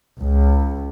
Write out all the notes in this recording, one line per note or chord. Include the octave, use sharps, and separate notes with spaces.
C#2